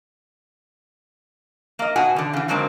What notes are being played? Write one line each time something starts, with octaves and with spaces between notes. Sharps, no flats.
A#3 D#5
B2 F#4 F#5 G#5
E2 D3
C#3 E3
D3 F#3 G#3 A#3 C4